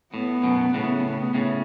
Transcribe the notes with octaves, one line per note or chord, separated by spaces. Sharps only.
A2 B3
F#2 B2
A2 C#3 B3
B3
A2 C#3